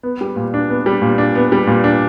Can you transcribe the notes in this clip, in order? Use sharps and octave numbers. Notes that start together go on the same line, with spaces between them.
B3
G3
A#2
D4
B3
G3
A#2
D4
B3
G3
A#2
D4